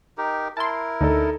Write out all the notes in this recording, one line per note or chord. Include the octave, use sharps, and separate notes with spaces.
D#4 G4 A#4
E4 A#4 A5 C6
D2 D4 D#4 A4